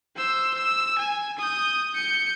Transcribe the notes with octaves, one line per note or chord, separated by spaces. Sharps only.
C5 E6
E6
G#5
D#6 G6
G6 C#7